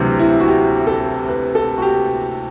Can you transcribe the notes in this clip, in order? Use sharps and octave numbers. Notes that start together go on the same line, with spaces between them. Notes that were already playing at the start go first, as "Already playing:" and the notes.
Already playing: D2 C3 E3 F#3 C4
E4
F#4
G4
A4
B4
A4
F#4
G4